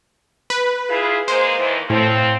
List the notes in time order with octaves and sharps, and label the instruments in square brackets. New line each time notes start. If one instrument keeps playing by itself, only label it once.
[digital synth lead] B4
[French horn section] E4 F4 G#4
[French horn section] G#3 A#3 [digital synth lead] C5
[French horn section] D#2 D#3 E3
[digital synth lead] A2 [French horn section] F3 C4